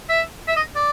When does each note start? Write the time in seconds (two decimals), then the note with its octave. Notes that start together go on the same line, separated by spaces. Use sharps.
0.09 E5
0.48 E5
0.56 D#5
0.76 D5